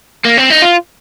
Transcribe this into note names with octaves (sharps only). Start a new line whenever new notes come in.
A#3
C4
D#4
F4